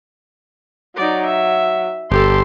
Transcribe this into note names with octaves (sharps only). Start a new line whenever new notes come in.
F#3 D#4 D5
E5
G1 G4 A4 C6